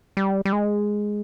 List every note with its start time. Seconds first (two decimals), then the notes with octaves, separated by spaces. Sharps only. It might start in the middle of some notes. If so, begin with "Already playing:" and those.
0.17 G3
0.45 G3
0.53 G#3